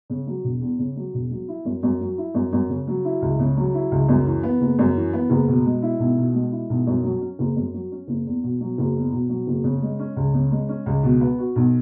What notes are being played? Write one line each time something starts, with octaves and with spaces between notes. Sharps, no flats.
C#3
F#3
E1
E2
C#3
F#3
E1
F#3
E4
F#2
F#2
F#3
E4
F#2
F#2
C#3
F#3
E4
C#2
C#3
F#3
E4
C#2
F#2
E3
B3
F#1
F#2
E3
B3
F#1
B2
G#3
E4
B1
B2
G#3
E4
B1
F#2
F#3
C#4
F#1
F#2
F#3
C#4
F#1
E2
B2
F#3
F#1
E2
B2
F#3
F#1
C#3
G#3
C#4
C#2
C#3
G#3
C#4
C#2
B2
B3
F#4
B1